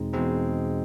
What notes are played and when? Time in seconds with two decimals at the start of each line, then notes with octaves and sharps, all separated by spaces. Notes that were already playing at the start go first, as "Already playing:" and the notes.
Already playing: E2 B2 G#3 C4 D#4
0.13 E2 B2 G#3 C4 D#4